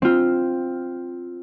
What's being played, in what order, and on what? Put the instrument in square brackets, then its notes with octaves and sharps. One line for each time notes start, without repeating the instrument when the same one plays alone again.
[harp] C4 F4